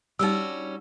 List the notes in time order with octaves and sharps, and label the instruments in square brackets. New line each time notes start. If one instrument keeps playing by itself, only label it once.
[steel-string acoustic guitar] G3 C#4 F#4 [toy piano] D#4 E6